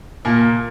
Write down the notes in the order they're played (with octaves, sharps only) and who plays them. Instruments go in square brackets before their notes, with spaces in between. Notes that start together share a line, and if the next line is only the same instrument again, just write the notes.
[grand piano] A#2 A#3